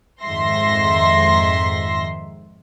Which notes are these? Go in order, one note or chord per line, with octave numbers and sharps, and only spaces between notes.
F2 G#2 D#3 E5 C6 A#6